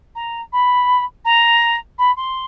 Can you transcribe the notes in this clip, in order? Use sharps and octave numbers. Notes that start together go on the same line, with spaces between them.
A#5
B5
A#5
B5
C6